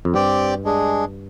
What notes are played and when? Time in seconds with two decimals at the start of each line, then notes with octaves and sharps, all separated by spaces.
0.05 F2
0.14 G2 C4 G4 D5 G5
0.64 G#3 D4 G#4